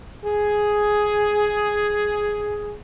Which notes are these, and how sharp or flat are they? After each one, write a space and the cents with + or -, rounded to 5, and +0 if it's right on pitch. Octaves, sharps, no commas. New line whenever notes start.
G#4 +5